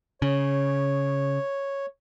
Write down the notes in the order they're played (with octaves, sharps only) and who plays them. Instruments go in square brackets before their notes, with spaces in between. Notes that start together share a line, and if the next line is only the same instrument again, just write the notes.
[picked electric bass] C#3 [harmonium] C#5